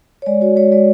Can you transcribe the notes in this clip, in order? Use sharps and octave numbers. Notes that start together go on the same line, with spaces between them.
C#5
G#3 D5
F#4 C#5
G#3 C#5
G#3 D5